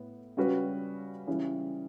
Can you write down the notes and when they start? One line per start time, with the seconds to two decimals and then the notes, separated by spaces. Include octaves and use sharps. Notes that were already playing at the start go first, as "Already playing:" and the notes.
Already playing: A2 B3
0.37 C#3 G3 C#4 F#4 B4
1.27 C#3 E3 G3 C#4